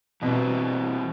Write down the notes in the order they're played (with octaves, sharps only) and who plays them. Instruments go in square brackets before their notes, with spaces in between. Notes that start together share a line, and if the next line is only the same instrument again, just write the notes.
[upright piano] B2 [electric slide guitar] E3 G3 C4 E4